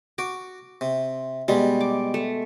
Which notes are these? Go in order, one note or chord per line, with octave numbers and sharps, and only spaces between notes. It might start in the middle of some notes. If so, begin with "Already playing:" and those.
F#4 D6
C3
B2 G3 G#3
D6
A3